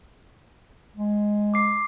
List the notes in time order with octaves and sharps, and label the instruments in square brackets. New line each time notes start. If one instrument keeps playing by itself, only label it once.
[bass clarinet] G#3
[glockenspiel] D6 C7